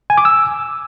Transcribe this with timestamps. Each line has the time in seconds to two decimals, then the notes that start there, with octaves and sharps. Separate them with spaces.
0.10 G#5
0.17 D6
0.25 E6